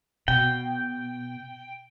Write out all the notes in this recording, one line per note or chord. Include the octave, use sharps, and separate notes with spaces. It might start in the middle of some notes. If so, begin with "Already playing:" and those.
B2 G5